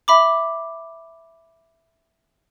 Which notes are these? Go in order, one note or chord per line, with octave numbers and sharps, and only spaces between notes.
E5 B5 D6